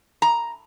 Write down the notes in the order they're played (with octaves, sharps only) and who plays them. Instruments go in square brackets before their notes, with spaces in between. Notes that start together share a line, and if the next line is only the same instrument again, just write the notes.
[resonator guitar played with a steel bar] A#5